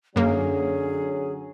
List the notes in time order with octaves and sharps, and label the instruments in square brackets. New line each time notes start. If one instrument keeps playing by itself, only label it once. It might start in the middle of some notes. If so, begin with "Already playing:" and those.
[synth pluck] F#2 A#3 [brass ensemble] D3 F#3 C#4 [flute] G#4